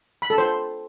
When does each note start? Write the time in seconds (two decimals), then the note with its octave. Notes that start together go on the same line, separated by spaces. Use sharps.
0.22 B5
0.30 A4
0.38 C5